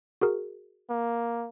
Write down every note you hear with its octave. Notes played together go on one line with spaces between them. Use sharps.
F#4 G#4 A#4
A#3